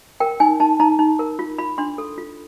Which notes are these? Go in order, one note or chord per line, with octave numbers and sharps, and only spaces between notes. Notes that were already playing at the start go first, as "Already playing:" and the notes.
A#4 G5
D#4 G#5
D#4 A5
D#4 A#5
D#4
A#4
F4
F4 B5
D4 C6
A4
F4